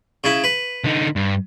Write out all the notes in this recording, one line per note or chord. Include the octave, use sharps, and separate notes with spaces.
C#3 E4
B4
D3 D#4
G2